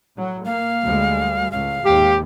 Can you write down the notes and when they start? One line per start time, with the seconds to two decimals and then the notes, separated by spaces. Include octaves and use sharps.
0.16 A2 F#3
0.46 A#3 F5
0.83 D2 G3 G#3
1.52 C#2 A2 F5
1.85 D#2 G#2 G4